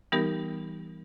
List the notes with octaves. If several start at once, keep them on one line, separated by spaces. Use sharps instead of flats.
E3 G3 B3 D#4 G4 A#4